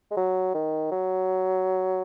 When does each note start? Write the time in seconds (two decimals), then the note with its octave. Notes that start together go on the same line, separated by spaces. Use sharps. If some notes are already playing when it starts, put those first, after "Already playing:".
0.11 G#3
0.17 F#3
0.54 D#3
0.91 F#3